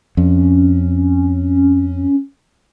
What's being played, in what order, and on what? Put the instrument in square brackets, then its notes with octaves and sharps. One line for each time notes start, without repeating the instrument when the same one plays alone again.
[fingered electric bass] F2 [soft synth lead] C#4